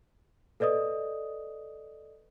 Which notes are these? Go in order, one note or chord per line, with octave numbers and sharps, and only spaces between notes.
A4 B4 D5 D#5 D#6